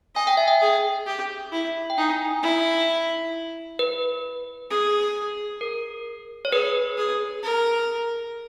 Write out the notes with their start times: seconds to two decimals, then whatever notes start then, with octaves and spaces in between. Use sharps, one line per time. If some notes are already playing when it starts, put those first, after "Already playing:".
0.16 D#5 G#5
0.27 G5
0.37 E5
0.48 G5
0.61 G#4
1.07 G4
1.53 E4
1.90 G5
1.98 D#4 G#5
2.43 E4
3.79 B4
4.70 G#4
5.61 A#4
6.45 C#5
6.52 G#4 B4
6.98 G#4
7.43 A#4